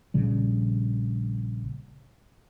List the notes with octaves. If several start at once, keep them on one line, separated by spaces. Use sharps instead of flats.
A#1 A#2 C#3 G3